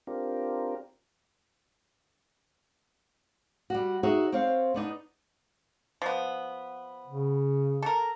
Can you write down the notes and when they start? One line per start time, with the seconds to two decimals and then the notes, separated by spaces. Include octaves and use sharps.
0.07 C4 D4 F4 G4 A#4
3.70 G3 F#4
4.03 D#4 F#4 G#4 C#5 E5
4.32 C4 C5 C#5 F5
4.74 B3 D4 D#4
6.02 F3 B3
7.08 C#3
7.82 A4 A#4